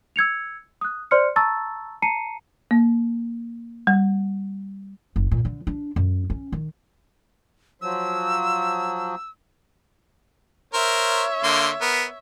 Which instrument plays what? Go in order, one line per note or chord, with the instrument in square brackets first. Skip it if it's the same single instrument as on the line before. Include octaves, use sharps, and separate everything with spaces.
[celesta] E6 G#6 C#7 F7
D#6 F#6
C5 D5 C6 F6 C#7
A5 A#5 C#6 E6 A6
A5 A#5 C7 C#7 D#7
[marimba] A#3
G3
[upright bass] F#1
A#2
D3
D4
F#2
C#4
D#3
[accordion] F3 F#3 [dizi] E6
[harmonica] A#4 C5 [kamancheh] C#5 E5
[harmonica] D3 A#3 C6
B3 A#4